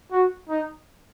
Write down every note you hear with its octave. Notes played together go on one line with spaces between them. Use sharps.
F#4
D#4